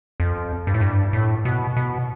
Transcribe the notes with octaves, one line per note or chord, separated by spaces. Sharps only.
F2
G2
A2
G2
A2
B2
B2